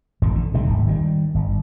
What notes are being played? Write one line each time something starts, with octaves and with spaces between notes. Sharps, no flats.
E1 A1 F2 D#3
D3
A#1 C3 D#3 G3
D1 G#1
D#3 E3 G3
G1